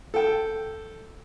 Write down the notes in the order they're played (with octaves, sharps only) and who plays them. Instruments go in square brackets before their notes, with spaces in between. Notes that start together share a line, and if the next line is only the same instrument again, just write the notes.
[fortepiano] A4 G5